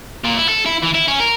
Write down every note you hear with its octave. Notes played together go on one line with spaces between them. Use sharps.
A#2
E4
A4
E4
E3
E4
C#4
A#4